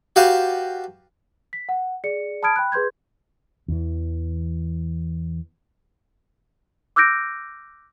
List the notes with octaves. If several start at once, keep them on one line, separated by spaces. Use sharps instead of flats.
F#4 G4 B4 F5 A5
B6
F#5
G#4 D5 C#7
A5 B5 D#6 F6 G#6 D7
G5 B5 F#6
G#4 B4 C6 G6 G#6
E2 E3
D6 E6 F#6 G6 A#6 D7